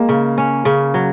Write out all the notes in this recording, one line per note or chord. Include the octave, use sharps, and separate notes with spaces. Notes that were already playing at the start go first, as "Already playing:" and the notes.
Already playing: G#3 A#3
C#3
C#4
C#3
F#3